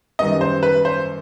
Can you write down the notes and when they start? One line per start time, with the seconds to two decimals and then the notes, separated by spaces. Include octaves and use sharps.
0.19 F#2 D#3 G3 B3 D#5
0.41 C5
0.63 B4
0.85 C5